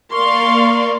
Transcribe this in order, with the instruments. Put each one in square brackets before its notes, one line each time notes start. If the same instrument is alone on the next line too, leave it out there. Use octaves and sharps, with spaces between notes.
[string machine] A#3 D5 [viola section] A#4 F5 C6 [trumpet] C#6